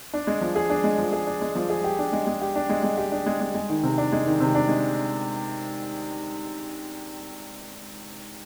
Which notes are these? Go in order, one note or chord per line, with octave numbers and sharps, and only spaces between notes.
D4
G#3
F3
G#4
D4
G#3
F3
G#4
D4
G#3
F3
G#4
G4
D4
G#3
G#3
G4
D4
G#3
G#3
G4
D4
G#3
G#3
G#3
D#3
C3
D4
G#3
D#3
C3
D4
G#3